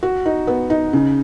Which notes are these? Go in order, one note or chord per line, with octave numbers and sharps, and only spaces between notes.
F#4
D#4
B3
D#4
C#3